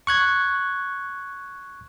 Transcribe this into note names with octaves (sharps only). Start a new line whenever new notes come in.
C#6 F#6 G#6